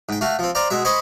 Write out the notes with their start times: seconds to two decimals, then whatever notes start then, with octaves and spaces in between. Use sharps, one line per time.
0.09 G#2 G5
0.21 A3 F#4 F5
0.39 F3 C4
0.55 C5 D5 F5 A#5
0.70 B2 G#3 E5
0.85 C5 D#5 G#5 B5 C#6